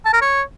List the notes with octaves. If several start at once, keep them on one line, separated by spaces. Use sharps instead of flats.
A5
A#4
C#5